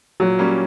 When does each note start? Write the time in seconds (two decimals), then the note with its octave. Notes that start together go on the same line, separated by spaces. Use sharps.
0.20 A#2 F#3
0.39 G3 A#3 C#4